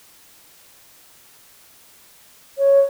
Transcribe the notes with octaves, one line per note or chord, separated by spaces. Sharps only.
C#5